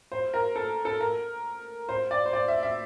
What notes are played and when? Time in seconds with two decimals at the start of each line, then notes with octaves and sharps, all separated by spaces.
0.12 C5
0.34 A#4
0.56 A4
0.85 A4
1.01 A#4
1.89 C5
2.11 D5
2.26 C5
2.33 D5
2.48 E5
2.63 E5